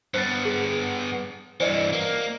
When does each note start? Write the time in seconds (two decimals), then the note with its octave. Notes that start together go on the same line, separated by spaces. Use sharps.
0.14 G2 B3 C5 A6
0.45 G#4
1.60 G2 E3 C5 D5 D#5
1.93 A#3